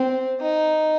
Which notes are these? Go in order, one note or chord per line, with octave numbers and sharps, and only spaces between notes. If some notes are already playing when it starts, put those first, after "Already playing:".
Already playing: C4
D#4